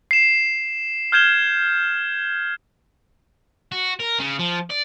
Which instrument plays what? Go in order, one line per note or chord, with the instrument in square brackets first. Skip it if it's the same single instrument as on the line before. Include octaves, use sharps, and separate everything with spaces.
[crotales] C7 E7
F6 G6 G#6 E7 G7
[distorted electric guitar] F#4
A#4
C#3
F3
D5